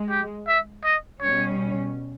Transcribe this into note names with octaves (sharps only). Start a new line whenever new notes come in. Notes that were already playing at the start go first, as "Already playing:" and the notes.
Already playing: G#3
G4
E5
D#5
B2 G3 C#4 C#5